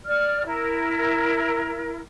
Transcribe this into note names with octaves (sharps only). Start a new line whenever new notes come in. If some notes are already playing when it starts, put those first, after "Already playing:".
D5 F6
E4 A#4